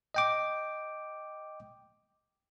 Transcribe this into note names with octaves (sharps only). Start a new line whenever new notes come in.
D#5 G5 D6